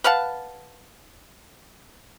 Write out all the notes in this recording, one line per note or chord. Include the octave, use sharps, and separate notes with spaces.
B4 F5 F#5 A5